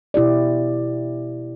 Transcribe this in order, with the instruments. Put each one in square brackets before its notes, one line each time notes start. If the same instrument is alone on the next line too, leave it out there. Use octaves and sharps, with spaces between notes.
[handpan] B2 E4 G4 D5